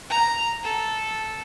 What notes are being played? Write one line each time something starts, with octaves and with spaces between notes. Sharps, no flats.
A#5
A4